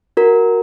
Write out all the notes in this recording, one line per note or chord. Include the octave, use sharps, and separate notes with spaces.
F#4 A#4